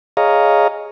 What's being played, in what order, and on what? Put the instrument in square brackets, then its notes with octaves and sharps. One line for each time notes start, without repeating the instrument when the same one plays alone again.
[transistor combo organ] G#4 C#5 D#5 F5 A#5